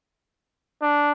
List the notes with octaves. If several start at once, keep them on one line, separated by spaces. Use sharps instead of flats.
D4